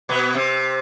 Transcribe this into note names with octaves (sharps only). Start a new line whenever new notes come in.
B2 B3
C3 C4